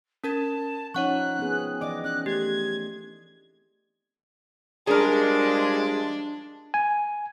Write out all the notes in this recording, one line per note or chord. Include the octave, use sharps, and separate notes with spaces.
C#4 A#4 A5 G#6
F3 C#4 D#4 C#5 F#5 C#6 F#6
B3 C4 G#4
E3 D5 D#5 D6
C#4 F#6
A3 G4 G#6
F3 G3 G#3 D4 G#4 A#4
G#5